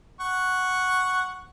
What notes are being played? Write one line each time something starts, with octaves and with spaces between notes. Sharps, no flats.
F#5 C#6